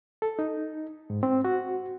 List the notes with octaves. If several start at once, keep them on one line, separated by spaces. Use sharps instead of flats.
A4
D#4
G#2
C4
F#4